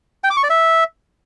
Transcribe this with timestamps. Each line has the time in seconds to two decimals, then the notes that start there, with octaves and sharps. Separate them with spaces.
0.24 G5
0.30 D6
0.37 C#6
0.43 D5
0.50 E5